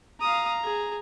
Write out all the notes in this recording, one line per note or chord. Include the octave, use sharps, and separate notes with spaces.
F5 A#5 D#6
G#4